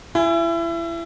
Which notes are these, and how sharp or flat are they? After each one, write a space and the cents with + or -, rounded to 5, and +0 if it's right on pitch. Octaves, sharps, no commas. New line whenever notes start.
E4 +30 G#5 -15